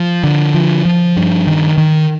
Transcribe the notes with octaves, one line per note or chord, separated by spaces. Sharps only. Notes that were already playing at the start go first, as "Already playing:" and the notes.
Already playing: F3
D3
F3
F3
G2
D#3
D#3